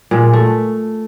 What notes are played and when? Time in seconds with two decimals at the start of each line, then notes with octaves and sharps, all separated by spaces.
0.11 A#2 G#3
0.33 A3